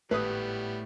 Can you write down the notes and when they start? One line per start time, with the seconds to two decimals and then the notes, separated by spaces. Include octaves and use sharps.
0.11 G#1 A2 G3 A3 B3 B4 D#6